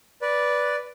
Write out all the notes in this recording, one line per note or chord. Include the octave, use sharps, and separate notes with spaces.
B4 D5